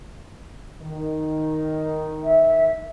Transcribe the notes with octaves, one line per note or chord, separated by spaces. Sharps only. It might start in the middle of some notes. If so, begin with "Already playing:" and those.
D#3
E5